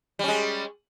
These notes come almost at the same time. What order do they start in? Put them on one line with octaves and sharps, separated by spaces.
G3 C#4 G#3